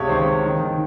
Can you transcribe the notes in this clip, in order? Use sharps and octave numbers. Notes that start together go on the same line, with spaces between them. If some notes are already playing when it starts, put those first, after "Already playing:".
Already playing: C#2 C3 C#5
D#3 C5
C#2
D#3
D#3